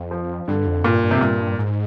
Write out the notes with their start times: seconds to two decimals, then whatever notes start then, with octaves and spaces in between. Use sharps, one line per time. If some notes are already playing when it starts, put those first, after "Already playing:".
Already playing: F2
0.11 F3
0.48 G2 D3
0.67 F2
0.84 G2 A#2
1.03 G2
1.11 C3
1.21 G2 A#2
1.58 G#2